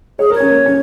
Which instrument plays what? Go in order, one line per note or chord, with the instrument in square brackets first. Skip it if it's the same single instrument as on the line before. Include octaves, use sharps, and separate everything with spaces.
[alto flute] G#4 [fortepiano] C#5
[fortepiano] A#4
[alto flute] C#5
[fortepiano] C#4
A#3
C#4